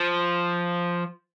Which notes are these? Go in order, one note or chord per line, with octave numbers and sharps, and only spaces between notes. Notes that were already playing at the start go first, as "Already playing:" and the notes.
Already playing: F3